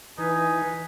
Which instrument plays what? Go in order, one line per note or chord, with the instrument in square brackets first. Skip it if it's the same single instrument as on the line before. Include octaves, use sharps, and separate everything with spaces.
[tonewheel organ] E3 [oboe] D#4 [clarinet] B4 [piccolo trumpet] G#5